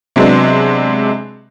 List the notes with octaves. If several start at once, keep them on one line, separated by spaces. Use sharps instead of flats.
C3 F#3 G#3 B3 D4